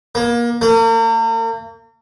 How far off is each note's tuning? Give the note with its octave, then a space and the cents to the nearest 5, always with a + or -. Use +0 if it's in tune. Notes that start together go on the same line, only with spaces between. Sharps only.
A#3 +30
A#3 -40